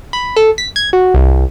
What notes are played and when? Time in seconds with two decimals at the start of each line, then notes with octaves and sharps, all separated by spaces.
0.13 B5
0.36 A4
0.58 B6
0.76 G#6
0.93 F#4
1.14 C2
1.32 C2